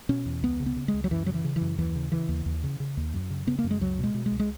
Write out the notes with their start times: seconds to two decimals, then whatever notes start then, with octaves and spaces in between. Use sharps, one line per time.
0.09 B2 C#4
0.26 E2
0.43 C#2 B3
0.60 C#3
0.66 B3
0.76 C#3
0.88 G#3
0.94 C#2
1.04 F#3
1.11 F#2 E3
1.26 C#3 F#3
1.34 E3
1.45 C#3
1.56 E3
1.61 F#2
1.78 D#2 E3
1.95 C#3
2.12 C#3 E3
2.29 D#2
2.46 D#2
2.63 C#3
2.80 C#3
2.97 D#2
3.14 F#2
3.30 C#3
3.47 C#3 B3
3.59 A#3
3.64 F#2
3.71 G#3
3.81 C#2 F#3
3.99 B2 G#3
4.14 B2
4.26 G#3
4.32 C#2
4.40 G#3